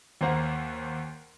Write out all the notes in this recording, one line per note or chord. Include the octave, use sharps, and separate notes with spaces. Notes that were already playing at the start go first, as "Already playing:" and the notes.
D#2 A#3 C5 F#5